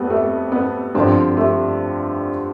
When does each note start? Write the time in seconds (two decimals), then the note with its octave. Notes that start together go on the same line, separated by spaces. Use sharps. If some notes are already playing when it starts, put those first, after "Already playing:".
Already playing: F2 G3 A3 B3
0.10 A3
0.52 B3
0.95 G2 D3 F3 C4
1.32 G3
1.37 A3